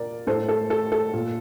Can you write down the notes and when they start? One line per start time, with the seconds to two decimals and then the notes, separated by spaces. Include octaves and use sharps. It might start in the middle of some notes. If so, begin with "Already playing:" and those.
Already playing: A#2 A#4 D5
0.27 A2 A4 C5
0.49 A4
0.70 A4
0.92 A4
1.13 A#2